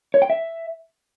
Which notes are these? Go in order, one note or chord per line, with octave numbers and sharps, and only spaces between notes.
C#5
G5
E5